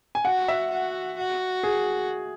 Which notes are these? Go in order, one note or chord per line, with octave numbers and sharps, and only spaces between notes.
G#5
F#4 F#5
E5
F#4
F#4
G#4